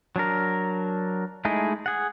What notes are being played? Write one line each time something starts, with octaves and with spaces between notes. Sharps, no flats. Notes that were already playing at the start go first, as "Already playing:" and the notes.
F#3 D4 A#4
G#3 A3 D#4 E4 G#4
G#4 F#5